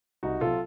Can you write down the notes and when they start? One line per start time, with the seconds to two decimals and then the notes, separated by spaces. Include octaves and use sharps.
0.23 C2 D#4 F#4
0.41 C3 F#3 F4 A4